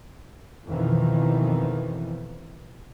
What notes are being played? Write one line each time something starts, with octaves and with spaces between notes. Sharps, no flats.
F2 B2 D#3 E3